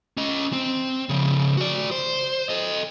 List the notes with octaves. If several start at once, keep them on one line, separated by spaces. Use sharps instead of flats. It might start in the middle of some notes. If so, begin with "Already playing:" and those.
C#4 D#5
C4
C#3 F3
F#4 D5
C5
A4 D#5